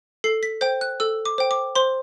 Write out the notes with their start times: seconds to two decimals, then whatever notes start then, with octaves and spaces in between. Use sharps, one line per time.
0.24 A4 C7
0.43 B6
0.61 C5 G5 G6
0.81 F#6
1.00 A4 E6
1.25 D6
1.38 C5 G5
1.51 D6
1.75 C5 C6